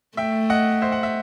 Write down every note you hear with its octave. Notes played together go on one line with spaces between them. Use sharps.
A3 E5 G5
D#5 F#5
C5 E5
F#5
E5